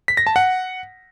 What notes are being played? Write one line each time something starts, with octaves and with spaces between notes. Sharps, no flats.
B6
A#6
A5
F#5